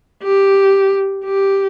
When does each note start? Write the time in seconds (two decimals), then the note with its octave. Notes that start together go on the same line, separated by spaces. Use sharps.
0.23 G4
1.25 G4